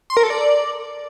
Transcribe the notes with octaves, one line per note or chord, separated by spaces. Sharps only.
C6
A#4
A4
D5